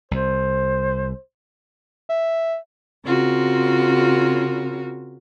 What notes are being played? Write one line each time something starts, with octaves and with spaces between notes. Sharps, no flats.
C2 C5
E5
C#3 C4 F4 F#4 A#4